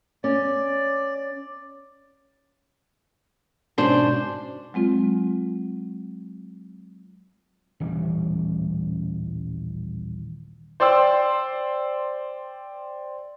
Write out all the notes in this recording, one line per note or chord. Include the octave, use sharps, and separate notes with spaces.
C#4 D5
G#2 B2 C#4 D4 C5
F#3 G#3 C4 F4
D#1 A1 E3 G3
C5 D5 G5 C6 E6